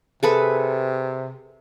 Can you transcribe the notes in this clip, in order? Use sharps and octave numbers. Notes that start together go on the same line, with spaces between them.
C3 G#4 A4 B4